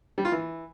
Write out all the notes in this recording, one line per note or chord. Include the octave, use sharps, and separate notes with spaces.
G3
F4
E3